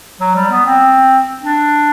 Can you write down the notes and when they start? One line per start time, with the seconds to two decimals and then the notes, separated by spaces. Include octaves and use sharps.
0.21 F#3
0.36 G3
0.51 B3
0.66 C4
1.41 D4